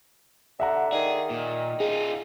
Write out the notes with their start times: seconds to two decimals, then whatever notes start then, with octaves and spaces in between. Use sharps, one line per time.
0.60 D3 E5 F#5 A#5
0.93 D#3 G#4 D5
1.30 A#2
1.80 D#4 F4 G#4